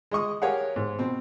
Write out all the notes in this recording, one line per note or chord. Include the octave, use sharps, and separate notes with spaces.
G#3 D#5 C#6 D#6
G4 G#4 A#4 C#5 F5 F#5
G#2
B2 C4